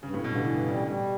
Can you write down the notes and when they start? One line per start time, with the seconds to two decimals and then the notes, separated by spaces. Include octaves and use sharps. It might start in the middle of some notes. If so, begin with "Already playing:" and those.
0.03 G2 C#3
0.14 A2
0.24 G2 B2
0.35 D3
0.45 G2 E3
0.67 C#3 G3
0.88 B2 G3